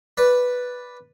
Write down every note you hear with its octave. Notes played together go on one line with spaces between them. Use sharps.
B4 D5